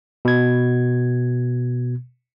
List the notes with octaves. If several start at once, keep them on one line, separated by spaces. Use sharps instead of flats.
B2 G#6